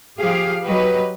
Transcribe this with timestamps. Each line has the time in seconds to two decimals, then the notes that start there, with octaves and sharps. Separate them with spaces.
0.19 F3 G4 G#4 F5
0.64 F#3 G4 B4 D#5